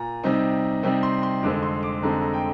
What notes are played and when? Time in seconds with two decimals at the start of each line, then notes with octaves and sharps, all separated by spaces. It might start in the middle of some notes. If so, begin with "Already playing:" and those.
Already playing: A#2 A#5
0.23 C3 G3 C4 D#4
0.83 C3 G3 C4 D#4
1.03 C6
1.23 C6
1.43 F2 D3 G#3 C4 D6
1.63 C6
1.83 D6
2.02 F2 D3 G#3 C4 A#5
2.22 A#5
2.34 G5